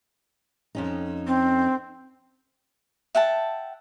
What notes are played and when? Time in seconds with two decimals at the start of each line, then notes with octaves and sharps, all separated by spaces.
0.75 F2 C#4 D#4
1.27 C4
3.15 E5 F#5 G5 A5